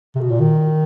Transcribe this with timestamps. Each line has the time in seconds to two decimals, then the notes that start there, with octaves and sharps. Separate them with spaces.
0.15 C3
0.21 B2
0.31 A#2
0.41 D#3